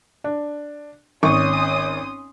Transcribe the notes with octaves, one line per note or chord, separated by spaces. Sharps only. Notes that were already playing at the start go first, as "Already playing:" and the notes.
D4
G#1 C#4 C6 C#6 D#6